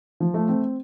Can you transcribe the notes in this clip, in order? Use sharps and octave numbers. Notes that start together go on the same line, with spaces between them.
F3
A3
C4